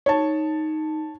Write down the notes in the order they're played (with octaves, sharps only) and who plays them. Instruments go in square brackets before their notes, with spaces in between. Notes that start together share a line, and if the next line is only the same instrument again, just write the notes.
[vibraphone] D#4 [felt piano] C#5 A5